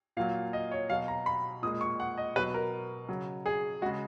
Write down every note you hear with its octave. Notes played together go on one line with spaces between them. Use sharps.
A#2 F#3 F5
D#5
C#5
B2 F#3 F5
A#5
B5
A#2 G#3 D#6
C#6
F#5
D#5
B2 F#3 B4
A#4
C#3 F#3
G#4
C#3 G#3 F#4